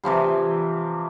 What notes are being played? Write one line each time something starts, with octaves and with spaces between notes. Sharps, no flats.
C3 E3 F3 G3